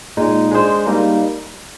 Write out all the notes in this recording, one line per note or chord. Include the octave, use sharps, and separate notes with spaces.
A#2 G#3 D#4
G#3 D4 G#4 C5
G3 A#3 D#4